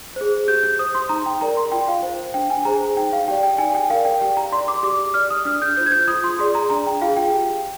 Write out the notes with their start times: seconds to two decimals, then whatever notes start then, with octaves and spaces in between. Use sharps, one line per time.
0.16 G#4 C5
0.48 G4 G6
0.63 G6
0.79 C5 D#6
0.95 C6
1.09 D#4 A#5
1.26 G5
1.41 A#4 D5 A#5
1.57 C6
1.72 F4 G5
1.88 F5
2.03 C5
2.34 D4 G5
2.50 G#5
2.65 G#4 C5 A#5
2.96 D#4 G5
3.13 F5
3.28 G4 G5
3.31 D5
3.43 G5
3.58 D#4 G#5
3.75 G5
3.90 A#4 F5
3.94 D5
4.05 G5
4.21 G4 G5
4.37 A#5
4.52 D5 C6
4.68 D6
4.83 G4 D6
5.14 D5 F6
5.30 D#6
5.45 D4 F6
5.62 G6
5.77 F4 C5 G6
5.86 G#6
5.92 G6
6.08 F4 D#6
6.24 C6
6.39 G#4 D5 C6
6.55 A#5
6.70 D4 A#5
6.86 G5
7.01 F4 G#4 F5
7.17 G5
7.32 G4